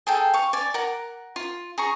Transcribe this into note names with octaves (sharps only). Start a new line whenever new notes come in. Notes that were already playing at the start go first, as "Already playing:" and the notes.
G#4 A4 G5
F5 C#6
D5 G#5
A#4 F#5
F4
G#4 A#5 C#6